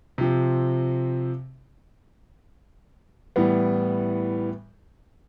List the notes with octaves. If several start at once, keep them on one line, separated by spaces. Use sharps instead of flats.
C3 F3 C4
A2 E3 G3 B3